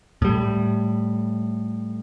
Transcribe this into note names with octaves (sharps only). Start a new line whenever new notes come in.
A2 G3